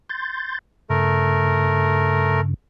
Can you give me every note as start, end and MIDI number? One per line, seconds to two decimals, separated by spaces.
0.09 0.59 84
0.09 0.59 91
0.09 0.59 93
0.90 2.54 43
0.90 2.54 49
0.90 2.41 57
0.90 2.41 70